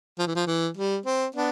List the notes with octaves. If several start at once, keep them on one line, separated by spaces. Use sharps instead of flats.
F3
E3
F3
E3
G3
C4
B3 D4